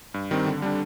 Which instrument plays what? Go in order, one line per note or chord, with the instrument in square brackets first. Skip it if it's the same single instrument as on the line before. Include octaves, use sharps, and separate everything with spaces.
[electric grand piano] G2
D#3 G3 C4
D3
G3 D4